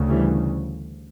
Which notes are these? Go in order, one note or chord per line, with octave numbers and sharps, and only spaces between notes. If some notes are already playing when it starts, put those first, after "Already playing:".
Already playing: D2 C#3
E3 G3